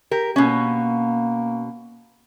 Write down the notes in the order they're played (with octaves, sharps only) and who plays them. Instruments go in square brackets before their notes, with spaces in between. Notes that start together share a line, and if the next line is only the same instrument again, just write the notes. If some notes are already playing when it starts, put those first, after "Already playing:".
[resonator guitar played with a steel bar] G4 A#4
[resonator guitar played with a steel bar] B2 C#4 [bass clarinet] A#3